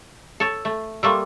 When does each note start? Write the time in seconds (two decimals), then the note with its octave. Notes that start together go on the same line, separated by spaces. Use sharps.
0.40 A4 C#5
0.65 A3
1.03 G3 A3 A#3 C6 C#6 E6